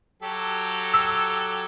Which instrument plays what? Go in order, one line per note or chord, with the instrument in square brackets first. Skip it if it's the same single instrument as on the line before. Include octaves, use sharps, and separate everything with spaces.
[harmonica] F#3 G4 A4
[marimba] E6